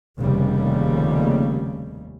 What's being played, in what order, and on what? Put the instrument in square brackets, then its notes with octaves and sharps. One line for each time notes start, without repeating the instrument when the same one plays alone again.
[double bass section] F1 D#2 C#3 G3